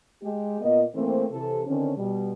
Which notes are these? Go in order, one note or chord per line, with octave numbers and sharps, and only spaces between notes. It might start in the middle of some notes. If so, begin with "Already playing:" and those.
G#3 G4
A#2 A#3 B3 D#5
E3 A3 A#3 C4
C3 E3 A4
D3 D#3 C4 C#4
B2 G3